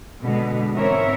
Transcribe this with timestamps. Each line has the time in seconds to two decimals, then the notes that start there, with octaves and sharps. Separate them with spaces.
0.22 B2 D3 G#3 B3
0.73 G#2 E3 C4 A#4 C#5 E5